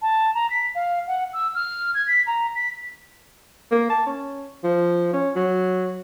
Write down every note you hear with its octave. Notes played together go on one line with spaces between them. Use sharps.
A5
A#5
B6
F5
F#5
E6
F6
G#6
B6
A#5
B6
A#3
A5
C#4
F3
C#4
F#3